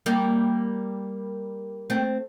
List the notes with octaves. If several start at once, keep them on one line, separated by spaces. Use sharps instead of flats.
G3 A#3
A3 C4